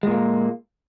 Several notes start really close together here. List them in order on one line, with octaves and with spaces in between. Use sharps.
G#3 A#2 A#3